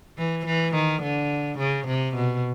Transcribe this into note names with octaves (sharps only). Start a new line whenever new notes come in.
E3
E3
D#3
D3
C#3
C3
B2